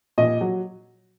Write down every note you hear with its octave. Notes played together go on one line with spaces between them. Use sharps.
A#2 D#5
F#3